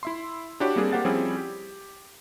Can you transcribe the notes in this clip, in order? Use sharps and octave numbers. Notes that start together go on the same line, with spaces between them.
E4 E5 C6
D4 E4 F#4 G4 C#5
G3 A#3 C4 D4 G#4
A#3 G4 C5 F#5 A6
F3 G3 C4 C#4 E4 G#4
G4